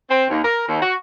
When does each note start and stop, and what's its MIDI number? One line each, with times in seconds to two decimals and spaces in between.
0.09 0.26 60
0.30 0.44 39
0.44 0.65 70
0.68 0.79 39
0.82 0.94 66